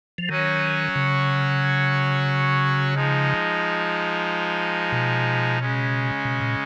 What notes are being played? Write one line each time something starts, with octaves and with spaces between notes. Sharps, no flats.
F3
D#3 F#3 C#4 F#4 C#5
C#3
F3 G#3 D#4
B2
C#3 G#3 C#4
B2
A#2